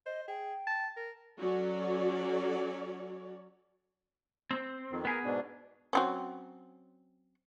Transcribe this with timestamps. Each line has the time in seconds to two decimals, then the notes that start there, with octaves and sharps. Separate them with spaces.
0.06 C5 D#5
0.28 G#4 G5
0.67 A5
0.97 A#4
1.38 F#3 C#4 F#4 A4 C#5 D5
4.51 C4
4.91 F2 D#3
5.05 B3 G#4 A#4
5.25 G#2 B2 D4
5.93 F#3 C4 C#4